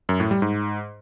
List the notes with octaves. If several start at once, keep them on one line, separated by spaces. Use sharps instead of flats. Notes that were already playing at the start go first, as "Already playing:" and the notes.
F#2
A2
G3
G#2